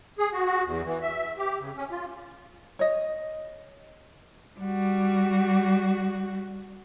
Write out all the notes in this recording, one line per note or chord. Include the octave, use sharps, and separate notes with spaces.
G#4
F#4
F#4
E2
E3
E5
G4
C#3
C#4
F4
C#5 D#5
G3 F#4